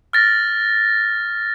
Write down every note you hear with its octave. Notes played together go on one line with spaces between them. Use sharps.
F6 A6 A#6